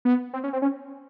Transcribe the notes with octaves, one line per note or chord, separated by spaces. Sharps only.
B3
C4
C#4
C4
C#4